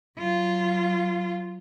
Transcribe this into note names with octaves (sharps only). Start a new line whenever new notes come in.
F#3 F4